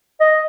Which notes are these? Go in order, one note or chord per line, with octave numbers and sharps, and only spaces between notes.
D#5